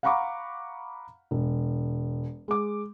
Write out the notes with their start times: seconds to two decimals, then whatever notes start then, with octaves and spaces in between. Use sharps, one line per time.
0.03 F5 F#5 A#5 B5 C#6 D6
1.31 E1
2.48 G#3 D6